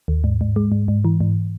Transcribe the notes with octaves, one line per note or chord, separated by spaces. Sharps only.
D#2
G#2
G#2
G#3
G#2
G#2
E3
G#2